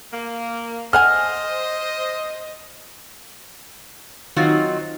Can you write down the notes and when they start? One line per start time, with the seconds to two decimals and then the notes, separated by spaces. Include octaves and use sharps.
0.12 A#3
0.93 A4 C5 D#5 F#5 G#5 F6
4.36 D#3 F#3 C4 D#4 F4 F#4